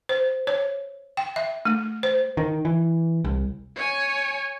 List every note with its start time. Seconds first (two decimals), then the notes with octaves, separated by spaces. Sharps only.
0.09 C5
0.47 C#5
1.17 G5
1.36 E5
1.65 A3
2.03 C5
2.37 D#3
2.65 E3
3.25 C2
3.76 C#5 G#5